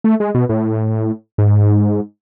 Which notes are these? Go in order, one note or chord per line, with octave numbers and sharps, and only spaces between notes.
A3
G#3
B2
A2
G#2